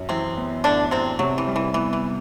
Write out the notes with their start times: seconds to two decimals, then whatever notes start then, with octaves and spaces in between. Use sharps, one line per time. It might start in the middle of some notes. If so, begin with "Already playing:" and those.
Already playing: F#2
0.09 C3 E3 C4
0.37 B3
0.64 A2 D3 D4
0.91 A2 C3 C4
1.19 C3 F#3
1.38 E3
1.47 G3
1.56 E3
1.74 E3 B3
1.93 E3